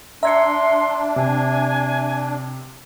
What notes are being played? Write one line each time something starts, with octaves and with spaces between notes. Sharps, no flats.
D4 E5 A#5 C6 G#6 C#7
C3 G#5